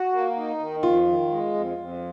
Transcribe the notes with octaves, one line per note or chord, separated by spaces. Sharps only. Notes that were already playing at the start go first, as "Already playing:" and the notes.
Already playing: F#4
A#3
D#4
D#3
F2 F4
D#3
G#3
F2
F2